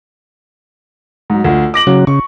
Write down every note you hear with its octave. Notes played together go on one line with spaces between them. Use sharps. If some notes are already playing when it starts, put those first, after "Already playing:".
G#2 F#3
D2 F4
D6 A#6 F#7
C#3 F#3
C#3 C#6